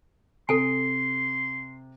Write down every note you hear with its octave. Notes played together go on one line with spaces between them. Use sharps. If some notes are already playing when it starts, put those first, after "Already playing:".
C3 A4 G#5 C6